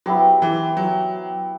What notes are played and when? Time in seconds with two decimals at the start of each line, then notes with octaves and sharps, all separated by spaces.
0.06 F#3 B3 E4 G4 C5
0.42 E3
0.77 F#3